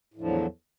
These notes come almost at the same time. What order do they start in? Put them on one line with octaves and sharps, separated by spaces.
A2 D3 F3 E2 F#3